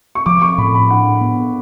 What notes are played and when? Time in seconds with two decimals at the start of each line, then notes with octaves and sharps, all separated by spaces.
0.15 C#6
0.26 F3 D6
0.42 C#6
0.58 A2 B5
0.75 B5
0.90 D4 F#5
1.21 B3